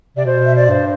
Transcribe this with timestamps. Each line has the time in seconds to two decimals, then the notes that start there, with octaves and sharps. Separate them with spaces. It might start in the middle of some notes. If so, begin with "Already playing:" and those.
0.16 C3 D5
0.25 B2 C5
0.44 E5
0.56 D5
0.68 G2 C5